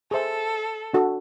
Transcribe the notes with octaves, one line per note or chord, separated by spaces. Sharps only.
G#4 A4 C5 E5 A5
D4 F#4 A4